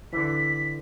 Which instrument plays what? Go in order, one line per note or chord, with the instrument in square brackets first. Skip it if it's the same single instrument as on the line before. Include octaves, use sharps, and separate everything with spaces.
[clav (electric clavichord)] D3 E3 [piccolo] B6